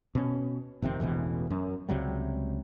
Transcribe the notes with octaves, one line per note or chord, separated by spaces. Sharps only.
B2 C#4
F1 C3 D#3 C4
E1 A1 B2 E3
F#2
C#2 C3 F#3 G3